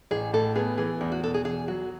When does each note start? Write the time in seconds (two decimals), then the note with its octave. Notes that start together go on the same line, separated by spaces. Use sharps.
0.11 A1 G#4
0.33 A2 A4
0.55 B3 G#4
0.78 E3 G#4
1.01 E2 E4
1.12 F#4
1.23 B2 A4
1.34 G#4
1.45 E2 G#4
1.68 F#3 F#4